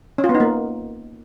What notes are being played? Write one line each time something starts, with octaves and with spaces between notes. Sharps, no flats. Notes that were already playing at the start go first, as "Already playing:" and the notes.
C#4
F4
B3
D#4
A#3